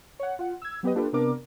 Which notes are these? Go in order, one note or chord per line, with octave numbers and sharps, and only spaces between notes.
C#5 F#5
F4 F#5
E6 G#6
F#3 B3 G4 B4 D#5
A#3 D4 F4 G4 A4 B4
C3 B3 D4 A#4 D6